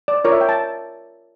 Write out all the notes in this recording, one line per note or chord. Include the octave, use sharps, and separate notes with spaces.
D5
F4 A#4 C#5 D5
E5
G5
A5